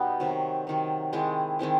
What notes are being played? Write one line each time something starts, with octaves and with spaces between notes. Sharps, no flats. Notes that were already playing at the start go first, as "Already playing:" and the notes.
Already playing: B2 G3 B3 D#4
C3 D#3 F#3
C3 D#3 F#3
D#3 G#3 C4 E4
D#3 G#3 C4 E4